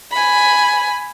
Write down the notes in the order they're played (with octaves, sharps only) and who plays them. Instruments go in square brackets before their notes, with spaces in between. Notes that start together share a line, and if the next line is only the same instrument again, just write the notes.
[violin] G#5 B5